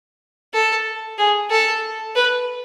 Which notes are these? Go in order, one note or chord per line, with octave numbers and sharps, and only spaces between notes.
A4
G#4
A4
B4